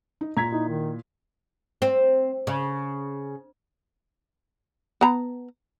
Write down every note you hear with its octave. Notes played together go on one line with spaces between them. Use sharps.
D#4
A#2 A#5 G#6 B6
D#4 E4
D#3
C4
C#3
B3 A#5